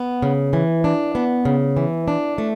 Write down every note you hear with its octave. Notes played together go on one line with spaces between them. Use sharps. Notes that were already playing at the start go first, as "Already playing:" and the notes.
Already playing: B3
C#3
E3
D4
B3
C#3
E3
D4
A3